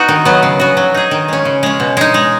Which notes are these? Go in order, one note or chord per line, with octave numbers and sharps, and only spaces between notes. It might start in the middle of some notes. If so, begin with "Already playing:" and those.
Already playing: B3 D#4 F#4
D#3
F#3 B3
C#3
B3 F#4
F#3
D#4 G#4
D#3
G#3 C#4
C#3
G#3 C#4
B2
G#3 D#4
G#3